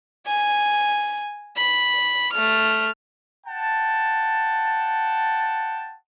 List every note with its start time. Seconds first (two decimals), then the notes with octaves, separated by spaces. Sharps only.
0.27 G#5
1.57 B5
2.34 A3 F6
3.47 F#5 G5 A5